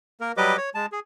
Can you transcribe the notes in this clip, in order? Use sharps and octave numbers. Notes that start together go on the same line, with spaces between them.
A#3 A#4
F#3 G3 G4 B4 D#5 D6
C#5
G#3 A5
G#4